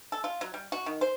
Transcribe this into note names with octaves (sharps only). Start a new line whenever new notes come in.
A4
F4
F#3
G3
F#4
D#3
C5